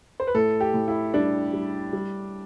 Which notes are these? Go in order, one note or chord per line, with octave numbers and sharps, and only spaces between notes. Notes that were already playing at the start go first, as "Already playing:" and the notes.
C5
B4
A2 A4
G4
A2
E4
G3 D4
G3
G3